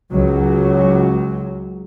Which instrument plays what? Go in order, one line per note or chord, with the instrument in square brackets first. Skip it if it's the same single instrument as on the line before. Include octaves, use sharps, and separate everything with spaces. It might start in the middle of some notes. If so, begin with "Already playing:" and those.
[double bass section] C#2 F#3